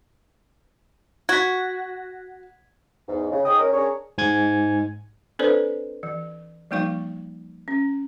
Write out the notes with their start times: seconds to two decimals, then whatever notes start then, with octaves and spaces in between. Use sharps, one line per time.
1.29 F#4 G#6 B6
3.08 E2 G#2
3.32 C#3
3.45 G#2 D#4 G#4 G5 D#6
3.59 C#4 A#4
3.72 C#4 D4 G#4 A#4 C#5
4.18 G#2 G#5 G#6
5.39 C4 D4 A4 B4 C5 D5
6.03 E3
6.71 F3 G3 A#3 D#4 F5 C#6
7.68 C#4